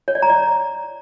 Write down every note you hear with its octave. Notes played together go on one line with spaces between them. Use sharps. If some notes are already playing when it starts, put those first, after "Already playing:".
C#5
D5
A#5
D5